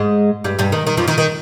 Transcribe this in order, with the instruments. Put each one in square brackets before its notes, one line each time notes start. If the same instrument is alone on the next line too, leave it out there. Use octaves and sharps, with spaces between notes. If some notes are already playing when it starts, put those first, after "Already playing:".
Already playing: [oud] G#2 G#3
G2 G3
G2 G3
D#3
D#3
F2 F3
D#3
D#3